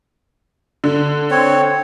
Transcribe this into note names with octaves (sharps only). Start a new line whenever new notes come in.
D3
C4 C#5